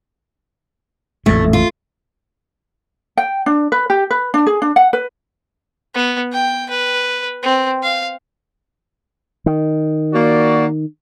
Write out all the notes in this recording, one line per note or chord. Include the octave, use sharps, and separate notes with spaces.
A1 F2 A#2 A3
F4
G5
D4
B4
G4
B4
D4
G#4
D4
F#5
B4
B3
G5
B4
C4
F5
D#3
A#3 F#4 D5